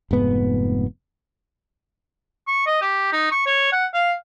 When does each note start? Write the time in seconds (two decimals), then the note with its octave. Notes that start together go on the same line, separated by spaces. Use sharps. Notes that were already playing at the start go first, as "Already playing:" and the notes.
0.11 F1 G#2 B3
2.47 C#6
2.66 D#5
2.81 G4
3.13 D#4
3.31 C#6
3.46 C#5
3.72 F#5
3.94 F5